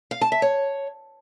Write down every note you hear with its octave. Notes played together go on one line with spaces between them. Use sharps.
F5
A5
E5
C#5